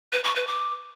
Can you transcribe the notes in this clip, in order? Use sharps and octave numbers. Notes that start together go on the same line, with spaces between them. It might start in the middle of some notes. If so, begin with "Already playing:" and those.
B4
C#6
B4
D6